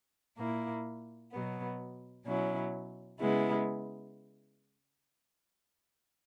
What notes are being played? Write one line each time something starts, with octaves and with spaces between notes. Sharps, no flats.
A#2 A#3 E4
B2 F#3 B3
B2 F#3 C#4 E4
C#3 G#3 B3 E4